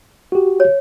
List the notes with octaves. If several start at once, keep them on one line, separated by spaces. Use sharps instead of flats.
F#4 G4
C#5